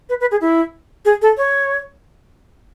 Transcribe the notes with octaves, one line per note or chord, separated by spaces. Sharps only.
B4
B4
G#4
E4
G#4
A4
C#5